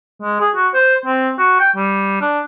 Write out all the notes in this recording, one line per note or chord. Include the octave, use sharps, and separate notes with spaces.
G#3
G#4
F#4
C5
C4
F#4
G5
G3
D4